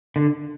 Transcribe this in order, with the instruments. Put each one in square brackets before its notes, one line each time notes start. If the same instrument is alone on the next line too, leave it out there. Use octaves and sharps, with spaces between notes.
[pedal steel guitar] D3